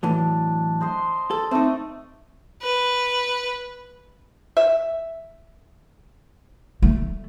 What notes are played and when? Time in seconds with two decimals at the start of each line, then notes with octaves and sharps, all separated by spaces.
0.03 A2 E3 F#3 D4
0.80 C5 D#5 C6
1.31 A4
1.51 A3 C4 D#4 D6
2.62 B4
4.57 E5
6.82 A3